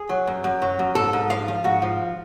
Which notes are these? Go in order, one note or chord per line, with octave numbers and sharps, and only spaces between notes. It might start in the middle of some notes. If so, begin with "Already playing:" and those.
Already playing: G#4
F#3
F#2
F#2
F#3
F#2
G#2 A4
G#2
F3 F5
F3
G#2 F#4
F3